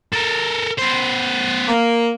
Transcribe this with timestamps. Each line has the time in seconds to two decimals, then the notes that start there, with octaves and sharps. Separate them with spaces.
0.14 A4 A#4
0.79 B3 C5
1.68 A#3